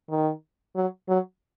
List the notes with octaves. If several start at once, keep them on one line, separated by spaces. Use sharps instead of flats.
D#3
F#3
F#3